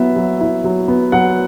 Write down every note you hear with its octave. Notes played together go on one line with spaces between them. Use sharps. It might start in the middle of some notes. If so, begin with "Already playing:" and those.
Already playing: F#3 B3 E4 E5
F#3
E4
F#3
B3
F#3 F#5